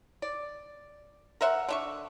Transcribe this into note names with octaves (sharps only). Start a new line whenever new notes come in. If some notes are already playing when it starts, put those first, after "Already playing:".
D5
A#4 C5 E5 F#5
D3 E5 C#6